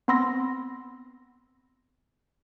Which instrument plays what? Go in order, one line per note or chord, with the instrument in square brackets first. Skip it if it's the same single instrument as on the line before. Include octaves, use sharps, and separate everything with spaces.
[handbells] B3 C4 B5 C6 E6 A#6